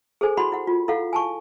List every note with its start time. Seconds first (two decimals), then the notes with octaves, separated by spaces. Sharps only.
0.21 G#4 A4 C5 G#5
0.37 E4 F#4 F#5 B5 C6
0.52 E4 F#5
0.67 F4
0.88 E4 A4 F5 F#5
1.13 G#5 A5 C#6